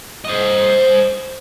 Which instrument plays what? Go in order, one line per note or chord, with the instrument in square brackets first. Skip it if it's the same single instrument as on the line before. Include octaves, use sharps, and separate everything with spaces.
[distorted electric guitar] C5 D#5